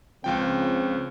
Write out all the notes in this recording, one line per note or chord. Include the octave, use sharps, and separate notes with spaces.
C#2 C#3 F3 C4 G5